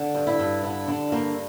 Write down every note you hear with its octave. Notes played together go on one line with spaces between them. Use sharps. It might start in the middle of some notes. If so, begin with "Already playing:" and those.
Already playing: D3
G2
E4
G2
D3 E4
D3 D4
G2 A#3